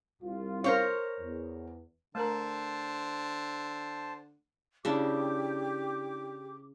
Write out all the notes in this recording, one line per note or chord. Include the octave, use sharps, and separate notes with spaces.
C2 F4
A#4 C5 C#5
E2
D3 A3 A#4 C5 A5 A#5
C#3 D4 E4 G4 D6